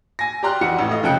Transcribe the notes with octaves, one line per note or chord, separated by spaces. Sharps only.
G#5 A#6
G4 D5 A#5 C6 F6 F#6
F2 E3 F#4 C#7
A1 A2
A3 D#5 F5
F1 C#3 F3 G5 F#6 C#7